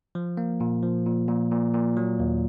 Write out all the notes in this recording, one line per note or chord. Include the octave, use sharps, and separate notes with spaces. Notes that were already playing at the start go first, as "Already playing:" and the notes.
F3
A#3
A#2
F3
A#2
A#2
A#2
A#2
F#3
D#2